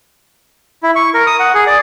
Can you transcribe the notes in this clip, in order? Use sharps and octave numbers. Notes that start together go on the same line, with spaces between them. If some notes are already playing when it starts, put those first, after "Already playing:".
E4
C#6
A#4
D#6
F#5
G#4
D5